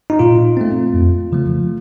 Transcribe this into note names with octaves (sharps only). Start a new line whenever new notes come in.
D#4
A#2 F4
A3 C4
F2
C#3 F3 A3